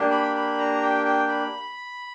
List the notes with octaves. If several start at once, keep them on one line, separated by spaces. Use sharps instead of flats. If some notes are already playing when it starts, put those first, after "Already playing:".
Already playing: A#3 D4 G4
B5
B5
A#5
G5
G5
B5